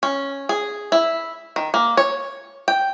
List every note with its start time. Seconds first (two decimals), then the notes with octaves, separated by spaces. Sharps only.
0.03 C#4
0.49 G#4
0.92 E4
1.56 D#3
1.74 A#3
1.97 C#5
2.68 G5